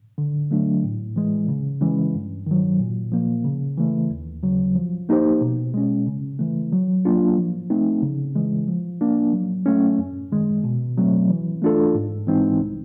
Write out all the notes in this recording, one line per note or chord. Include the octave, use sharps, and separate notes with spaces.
D3
F#3 A3 D4
A2
E3 G#3
C#3
E3 G#3 C#4
G2
D#3 F#3
A#2
F3 A#3
C#3
E3 A3
D#2
C#3 F#3
F3
A#3 D#4 G4 C5
B2
G#3 C#4
C#3
E3 A3
F#3
A#3 D4 F4
F3
A3 C4 D#4
C#3
E3 G#3
F3
A#3 D4
F#3
A3 C#4
F#2
D#3 G#3
B2
F#3 A3 C4
E3
A3 D4 F4 A4
G#2
E3 G#3 C4 D#4
C2